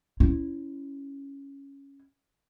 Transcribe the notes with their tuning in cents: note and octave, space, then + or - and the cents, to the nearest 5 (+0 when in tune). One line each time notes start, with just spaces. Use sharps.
C#4 +0 E4 +0